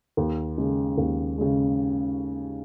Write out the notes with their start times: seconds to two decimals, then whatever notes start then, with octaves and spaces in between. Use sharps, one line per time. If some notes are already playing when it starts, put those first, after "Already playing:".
0.17 D#2
0.58 C#3 G#3
0.98 D#2
1.38 C#3 G#3